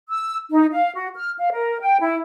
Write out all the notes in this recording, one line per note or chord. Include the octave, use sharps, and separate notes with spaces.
E6
D#4
F5
F#4
F6
F5
A#4
G5
E4